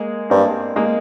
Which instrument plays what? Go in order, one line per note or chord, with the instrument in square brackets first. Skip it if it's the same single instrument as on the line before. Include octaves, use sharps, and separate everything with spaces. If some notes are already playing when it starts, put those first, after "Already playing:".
Already playing: [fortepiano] G#3 A#3
[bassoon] G2 [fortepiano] A#3 C4
[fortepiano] G#3 A#3